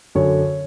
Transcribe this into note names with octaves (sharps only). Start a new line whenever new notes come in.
F#2 D3 C#5